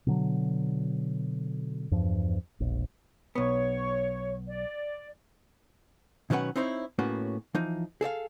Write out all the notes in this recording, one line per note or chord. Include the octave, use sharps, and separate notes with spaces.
B2 D3 F#3
E2 G2 F3
E1 A#1
B1 B3 C#5 C#6
D5
B2 D#3 F#3 C#4 B4 F#5
C4 D#4 E4 C5 C#5
A2 A#3 B3 C#4 F#4
E3 F3 D#4
G#4 A4 C#5 F5